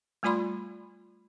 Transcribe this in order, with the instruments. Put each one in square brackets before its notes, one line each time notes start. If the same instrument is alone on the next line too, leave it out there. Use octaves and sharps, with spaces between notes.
[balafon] G3 A3 F4 D5 B5 C6